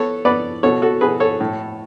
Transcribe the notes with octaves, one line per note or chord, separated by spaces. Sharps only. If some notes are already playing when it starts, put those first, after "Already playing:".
Already playing: B3 A4 C#5
B3 B4 D5
B2 A4 C#5
F#4 A4
B2 G#4 B4
A4 C#5
A2